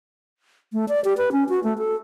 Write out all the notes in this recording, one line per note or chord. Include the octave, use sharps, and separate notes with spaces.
A3
D5
G4
B4
C#4
F#4
A3
A4